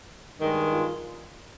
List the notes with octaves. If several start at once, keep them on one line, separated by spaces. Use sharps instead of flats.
G2 D#3 G#3
F4